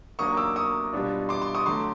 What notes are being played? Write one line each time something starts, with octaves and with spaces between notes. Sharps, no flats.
D#2 D#3 F#3 A#3 D4 C#6 D#6
D6 E6
C#6 D#6
B2 G3 B3 D4 F4
C6 D6
C6 D6
C#6 D#6
D3 F#3 A3 C6 D6